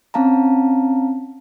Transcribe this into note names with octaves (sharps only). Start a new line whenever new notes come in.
C4 C#4 F5 A5 A#5